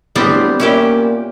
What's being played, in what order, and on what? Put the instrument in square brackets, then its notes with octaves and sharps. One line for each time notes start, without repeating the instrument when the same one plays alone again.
[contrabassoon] D1 [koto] G3 B3 C4
[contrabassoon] A#2 [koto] C#4 E4 G4